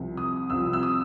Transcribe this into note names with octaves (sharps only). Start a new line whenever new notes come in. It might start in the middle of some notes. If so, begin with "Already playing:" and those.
Already playing: C2 C3 F3
D#6
C2 C3 F3 E6
E6
D#6